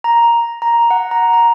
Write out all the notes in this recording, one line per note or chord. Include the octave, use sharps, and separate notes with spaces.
A#5
A#5
F#5
A#5
A#5